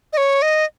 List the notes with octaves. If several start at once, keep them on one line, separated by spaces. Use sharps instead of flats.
D#5
C#5
D#5